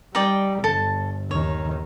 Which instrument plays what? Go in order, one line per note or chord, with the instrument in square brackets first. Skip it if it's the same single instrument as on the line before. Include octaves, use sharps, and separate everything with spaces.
[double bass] G3 [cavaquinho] D#4 D5 G5
[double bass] G1 [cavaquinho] A4 A5
[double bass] D#2 D#3 [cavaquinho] C#5